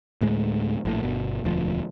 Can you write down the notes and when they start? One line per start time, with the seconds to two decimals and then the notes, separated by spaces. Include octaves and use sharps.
0.21 D2 A2 G#3
0.85 A#1 A2
1.03 G1 B2
1.44 E1 D2 F3